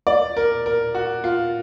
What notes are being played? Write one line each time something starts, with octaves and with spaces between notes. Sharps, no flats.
D5
A#4
A#4
F#4
F4